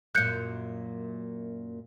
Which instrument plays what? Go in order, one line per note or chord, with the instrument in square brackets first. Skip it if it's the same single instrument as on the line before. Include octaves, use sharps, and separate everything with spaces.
[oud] F#2 A#2 [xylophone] F#6 G6 C#7